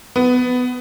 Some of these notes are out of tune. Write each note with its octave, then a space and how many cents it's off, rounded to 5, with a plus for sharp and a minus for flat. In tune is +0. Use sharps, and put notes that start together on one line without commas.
B3 +15